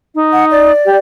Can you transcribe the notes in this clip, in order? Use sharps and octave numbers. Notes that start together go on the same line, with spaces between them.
D#4
F#5
D5
G4